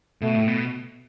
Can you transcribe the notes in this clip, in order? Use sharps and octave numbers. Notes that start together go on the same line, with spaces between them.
B2 A3
A2
B2